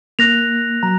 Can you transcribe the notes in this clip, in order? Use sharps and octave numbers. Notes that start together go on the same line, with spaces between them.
A#3 F#6 A#6 F7
F#3 A#5